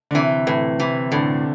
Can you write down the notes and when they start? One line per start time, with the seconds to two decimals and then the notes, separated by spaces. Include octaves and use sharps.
0.11 D3
0.14 C3 E3
0.47 A2 E3
0.79 C3 E3
1.12 A2 D3